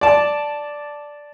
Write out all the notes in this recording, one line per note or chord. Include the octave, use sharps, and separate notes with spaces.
D5 A5